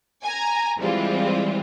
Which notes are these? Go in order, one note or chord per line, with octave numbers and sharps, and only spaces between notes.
G#5 A#5
E3 G3 G#3 C4 F4